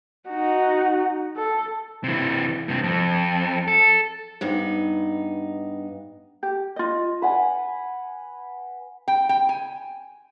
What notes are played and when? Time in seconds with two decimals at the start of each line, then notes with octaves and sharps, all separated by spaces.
0.29 D#4 F#4
1.37 A4
2.04 C3 E3
2.68 G2 C3
2.83 F2
3.68 A4
4.41 G2 B3 D#4
6.43 G4
6.76 F4 D#5
7.22 B4 F#5 G#5
9.08 G5
9.29 G5
9.49 G#5